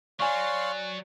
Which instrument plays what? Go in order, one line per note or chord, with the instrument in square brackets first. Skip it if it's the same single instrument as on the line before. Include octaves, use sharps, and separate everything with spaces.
[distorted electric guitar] F#3 [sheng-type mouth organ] C#5 F5 C6 [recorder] D5 [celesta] G#5 C#6